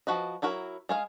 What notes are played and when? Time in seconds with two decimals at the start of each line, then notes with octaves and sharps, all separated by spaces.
0.07 F3 F#4 B4 D#5
0.42 F#3 E4 F#4 A#4
0.89 G#3 G#4 F5